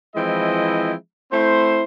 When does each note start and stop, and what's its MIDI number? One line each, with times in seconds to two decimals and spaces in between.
0.16 0.93 52
0.16 0.93 53
0.16 0.93 56
0.16 0.93 60
0.16 0.93 64
0.16 0.93 75
1.32 1.84 57
1.32 1.84 60
1.32 1.84 64
1.32 1.84 72